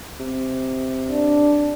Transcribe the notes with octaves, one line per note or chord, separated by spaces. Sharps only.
C3
D4